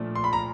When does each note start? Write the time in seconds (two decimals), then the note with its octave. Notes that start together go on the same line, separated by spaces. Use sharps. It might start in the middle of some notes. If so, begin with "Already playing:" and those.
Already playing: A#2 F3 A3 D4
0.16 C6
0.24 B5
0.33 A#5